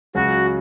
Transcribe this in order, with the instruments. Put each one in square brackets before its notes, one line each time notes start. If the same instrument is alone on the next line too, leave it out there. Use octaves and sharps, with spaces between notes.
[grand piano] C#2 C#3 F#3 [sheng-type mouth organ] F#4